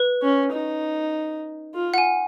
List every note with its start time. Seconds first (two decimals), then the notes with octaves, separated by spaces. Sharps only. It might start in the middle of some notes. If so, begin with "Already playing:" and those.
Already playing: B4
0.22 C#4
0.53 D#4
1.74 F4
1.94 F#5
1.98 G#5